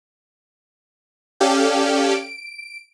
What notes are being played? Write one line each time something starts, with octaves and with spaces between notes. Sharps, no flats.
C#4 G4 A4 D5 F5 G5
D7